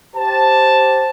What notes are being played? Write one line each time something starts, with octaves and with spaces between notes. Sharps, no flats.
G4 C5 A5